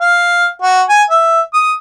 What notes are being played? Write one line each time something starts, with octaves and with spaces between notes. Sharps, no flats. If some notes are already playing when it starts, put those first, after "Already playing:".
F5
F#4
G#5
E5
D#6